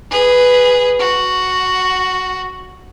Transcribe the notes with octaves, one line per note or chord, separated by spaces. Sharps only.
G#4 B4
F#4